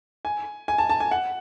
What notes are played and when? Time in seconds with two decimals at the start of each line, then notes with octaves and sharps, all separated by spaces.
0.25 G#5
0.68 G#5
0.78 A5
0.89 A5
1.00 G#5
1.11 F#5